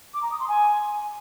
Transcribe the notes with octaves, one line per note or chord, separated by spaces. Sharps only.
D6
A#5
D#6
C6
G#5